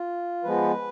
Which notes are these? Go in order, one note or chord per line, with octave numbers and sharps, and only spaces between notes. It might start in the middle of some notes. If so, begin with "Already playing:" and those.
Already playing: F4
F3 G#3 B3 B4